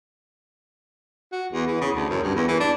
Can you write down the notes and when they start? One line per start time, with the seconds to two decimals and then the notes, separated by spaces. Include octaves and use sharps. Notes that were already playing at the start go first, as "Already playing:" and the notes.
1.32 F#4
1.52 E2
1.68 E3
1.81 C#3
1.95 D2
2.10 F#2
2.23 G2
2.35 E2
2.48 E3
2.60 D4